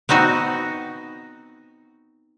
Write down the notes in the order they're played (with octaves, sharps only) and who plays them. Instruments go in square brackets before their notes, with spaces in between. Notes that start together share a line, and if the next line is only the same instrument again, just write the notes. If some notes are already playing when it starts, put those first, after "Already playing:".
[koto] B3 C4 D#4 F#4